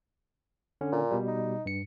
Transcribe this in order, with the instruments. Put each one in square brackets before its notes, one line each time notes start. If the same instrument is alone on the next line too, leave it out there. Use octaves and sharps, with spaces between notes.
[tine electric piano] D3 C#4
[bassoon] A#2
[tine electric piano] B2 G3
[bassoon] D#4
[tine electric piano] G2 C#7